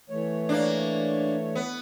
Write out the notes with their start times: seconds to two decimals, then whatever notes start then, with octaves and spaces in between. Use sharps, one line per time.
0.10 E3 A3 C#5
0.49 A#3 D4
1.55 B3